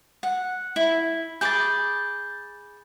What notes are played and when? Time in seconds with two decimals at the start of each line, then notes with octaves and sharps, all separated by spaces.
0.23 F#5
0.76 E4
1.41 G#4 B5 D6 G6 A6